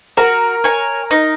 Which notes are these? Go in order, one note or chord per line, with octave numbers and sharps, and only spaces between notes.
F#4 A#4
C#5 G#5
D#4